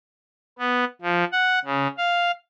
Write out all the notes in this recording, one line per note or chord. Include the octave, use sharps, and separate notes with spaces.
B3
F3
F#5
C#3
F5